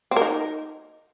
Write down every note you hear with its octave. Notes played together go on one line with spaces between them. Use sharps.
C4
A#4
D#4